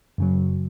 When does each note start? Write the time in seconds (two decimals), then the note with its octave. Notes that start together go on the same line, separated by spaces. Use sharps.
0.18 F#2 C#3 F#3